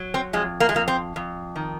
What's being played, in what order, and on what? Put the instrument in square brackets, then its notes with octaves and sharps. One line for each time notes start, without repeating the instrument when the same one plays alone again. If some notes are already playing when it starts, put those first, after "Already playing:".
Already playing: [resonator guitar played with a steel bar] F#3
C4
F2 G#3
A#3
G#3
F2 A#3
C4
F2
D#3